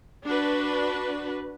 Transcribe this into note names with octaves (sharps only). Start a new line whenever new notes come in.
D4 F#4 B4